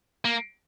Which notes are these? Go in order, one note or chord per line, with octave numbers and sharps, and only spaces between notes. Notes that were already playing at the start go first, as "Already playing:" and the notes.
A#3